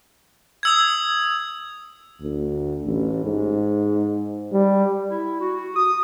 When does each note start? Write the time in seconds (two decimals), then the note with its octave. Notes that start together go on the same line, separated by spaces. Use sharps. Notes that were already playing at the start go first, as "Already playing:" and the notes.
0.63 D#6 E6 G#6
2.21 D2
2.85 A1
3.24 G#2
4.52 G3
5.11 E4
5.40 F#4
5.76 D#6